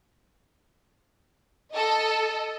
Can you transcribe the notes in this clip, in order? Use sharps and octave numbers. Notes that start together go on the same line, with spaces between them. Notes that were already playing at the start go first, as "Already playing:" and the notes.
A4 D#5